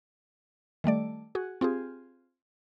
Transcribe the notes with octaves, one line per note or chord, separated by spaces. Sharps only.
D#3 G3 A3 D5
F#4 G#4
C4 F4 G4 G#4